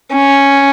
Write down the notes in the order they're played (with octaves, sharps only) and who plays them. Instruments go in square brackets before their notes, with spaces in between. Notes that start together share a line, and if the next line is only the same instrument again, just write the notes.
[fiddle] C#4